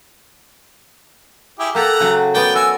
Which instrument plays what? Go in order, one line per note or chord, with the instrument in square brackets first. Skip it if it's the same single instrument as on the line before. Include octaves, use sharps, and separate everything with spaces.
[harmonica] E4 G4 G#4
[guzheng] A#3 G4 A4 [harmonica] F#5 A#5 E6
[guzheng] C#3 F#3
[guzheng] B3 D5 [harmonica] G5
[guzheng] F#4 [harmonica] G#5 E6